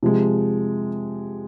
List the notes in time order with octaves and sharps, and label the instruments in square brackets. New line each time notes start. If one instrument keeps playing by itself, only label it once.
[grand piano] C3 F3 G#3